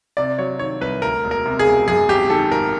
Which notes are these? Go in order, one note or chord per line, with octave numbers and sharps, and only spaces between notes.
C3 D5
F#3 C#5
D#3 C#5
C2 B4
D2 A#4
E1
A#4
C3
G#4
E1
F#2 G#4
G#1 G4
D#3 A4
G#1 A#4